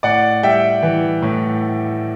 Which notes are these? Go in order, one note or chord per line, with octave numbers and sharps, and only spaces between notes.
A2 D5 F#5
G3 E5 G5
E3
A2